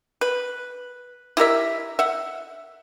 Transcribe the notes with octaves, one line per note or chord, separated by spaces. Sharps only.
B4
E4 G4 A#4 E5
E5 F#5